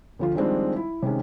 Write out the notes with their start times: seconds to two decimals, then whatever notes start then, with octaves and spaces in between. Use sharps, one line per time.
0.19 D2 F3 F4
0.35 D#3 F3 G3 G#3 C4 D4
0.76 E4
1.02 C3 D#3 G#3 C#4